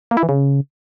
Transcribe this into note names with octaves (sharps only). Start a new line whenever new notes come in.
A#3
E4
E3
C#3